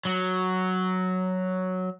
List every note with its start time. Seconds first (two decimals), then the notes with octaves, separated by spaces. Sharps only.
0.05 F#3 F#4